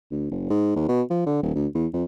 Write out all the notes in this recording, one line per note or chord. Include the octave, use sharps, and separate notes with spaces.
D2
F#1
G#2
D#2
B2
F3
D3
D#1
D2
E2
F2